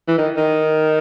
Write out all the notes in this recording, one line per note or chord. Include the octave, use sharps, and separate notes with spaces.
E3
D#3
D#3